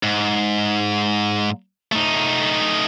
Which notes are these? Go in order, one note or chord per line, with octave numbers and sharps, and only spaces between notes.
G#2
A3 D#4